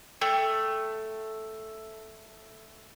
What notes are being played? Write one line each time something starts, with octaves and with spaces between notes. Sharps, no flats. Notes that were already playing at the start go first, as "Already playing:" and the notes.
A3 G5